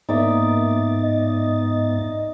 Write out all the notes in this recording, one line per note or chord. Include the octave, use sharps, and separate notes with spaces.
G#2 A#3 B3 D#4 D5 E5 A6
D#5